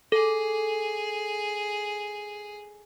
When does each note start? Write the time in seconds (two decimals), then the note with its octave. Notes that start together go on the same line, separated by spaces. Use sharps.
0.12 G#4 A4